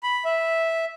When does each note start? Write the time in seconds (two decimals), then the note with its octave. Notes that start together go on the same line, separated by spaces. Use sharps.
0.03 B5
0.25 E5